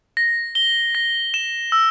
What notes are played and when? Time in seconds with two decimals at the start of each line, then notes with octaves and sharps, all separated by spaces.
0.17 A#6
0.55 G7
0.95 A#6
1.34 E7
1.72 E6